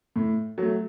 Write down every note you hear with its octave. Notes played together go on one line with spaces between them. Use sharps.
A2
F#3 A3